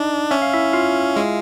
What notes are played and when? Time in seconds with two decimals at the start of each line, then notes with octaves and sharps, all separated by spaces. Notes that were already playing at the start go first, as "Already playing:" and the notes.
Already playing: D4 D#4 D#5
0.31 C#4 E5
0.42 F5
0.53 E4 E5
0.73 F4 F5
1.16 G#3